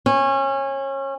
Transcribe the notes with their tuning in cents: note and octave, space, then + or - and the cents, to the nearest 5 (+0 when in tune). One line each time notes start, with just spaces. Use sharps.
C#4 -25